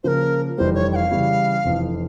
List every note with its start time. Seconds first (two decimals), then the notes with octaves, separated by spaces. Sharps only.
0.04 C#3 F3 A#3 A#4 C5
0.57 F1 F2 E3 G3 C5
0.75 C#5
0.92 G5
0.96 F5
1.11 C#3 E3 G3 C#4 E4
1.65 F1 F2 E3